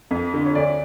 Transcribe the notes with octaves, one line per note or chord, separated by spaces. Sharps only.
F2
D3
C#5
D2 D5